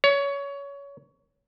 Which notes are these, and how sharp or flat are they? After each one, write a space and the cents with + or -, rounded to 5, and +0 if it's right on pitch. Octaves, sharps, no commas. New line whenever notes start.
C#5 +20